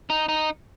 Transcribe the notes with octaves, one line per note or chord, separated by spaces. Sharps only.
D#4
D#4